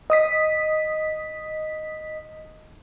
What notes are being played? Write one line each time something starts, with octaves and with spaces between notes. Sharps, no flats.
D#5 D#6 B6